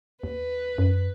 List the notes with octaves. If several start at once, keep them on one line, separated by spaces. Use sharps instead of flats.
D#2 B4
F#2